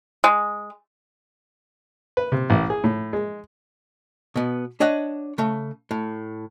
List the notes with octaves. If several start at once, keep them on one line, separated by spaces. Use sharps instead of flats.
G#3
B4
C3
A1
G#4
A2
G#3
B2 B3
D4 C#5 D#5 F#5
C#3 A3
A2